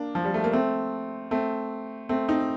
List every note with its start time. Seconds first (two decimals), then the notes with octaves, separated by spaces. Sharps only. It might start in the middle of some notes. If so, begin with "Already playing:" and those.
Already playing: A#3 D4
0.15 F3
0.25 G3
0.34 A3
0.44 A#3
0.53 A3 C4
1.31 A3 C4
2.09 A3 C4
2.28 C4 D#4